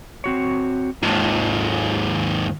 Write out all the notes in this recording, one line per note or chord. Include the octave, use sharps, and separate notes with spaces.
C4 F#4 C#5
D#2 G#2 F4 A5